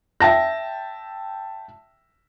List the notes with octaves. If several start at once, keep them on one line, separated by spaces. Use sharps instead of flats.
E5 G5 A5 A#6